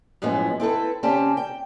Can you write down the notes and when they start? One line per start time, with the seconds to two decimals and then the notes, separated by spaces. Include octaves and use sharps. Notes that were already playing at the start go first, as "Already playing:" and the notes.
0.22 F#2 A2 F3 G#3 B3
0.60 C4 E4 A4 B4
1.03 C#3 C4 C#4 G4 D5 A5
1.37 G5